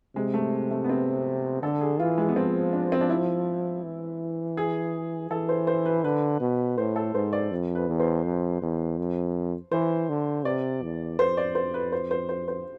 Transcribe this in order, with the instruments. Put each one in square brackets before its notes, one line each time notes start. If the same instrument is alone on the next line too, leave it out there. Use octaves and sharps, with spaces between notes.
[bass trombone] C3 [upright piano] G#3
[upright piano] A3
A3
B3
C4
[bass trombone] D3 [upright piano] A4
[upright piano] G#4
[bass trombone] E3 [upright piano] F4
[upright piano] G#3
B3
[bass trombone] F3 [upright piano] C4
[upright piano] D4
C4
D4
E4
[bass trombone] E3
[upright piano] G#4
[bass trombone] E3 [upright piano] A4
[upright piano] C5
C5
B4
[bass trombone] D3 [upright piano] B4
[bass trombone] B2
[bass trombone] A2 [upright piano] C5
[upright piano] A4
[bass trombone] G#2 [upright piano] C5
[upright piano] D5
[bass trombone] F2
[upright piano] B4
[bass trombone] E2
[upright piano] C5
[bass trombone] F2
E2
F2
[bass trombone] E3 [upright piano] C5
[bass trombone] D3
[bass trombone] C3 [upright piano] D5
[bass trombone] E2
[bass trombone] F2 [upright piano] C5
[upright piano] D5
C5
B4
C5
C5
C5
C5